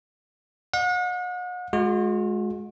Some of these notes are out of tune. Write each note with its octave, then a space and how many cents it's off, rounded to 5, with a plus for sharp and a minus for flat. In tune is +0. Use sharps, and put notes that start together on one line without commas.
D#5 -35 F#5 -40
G#3 +20 F#4 -40